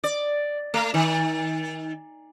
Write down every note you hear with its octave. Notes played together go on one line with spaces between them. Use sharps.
D5
A3
D#3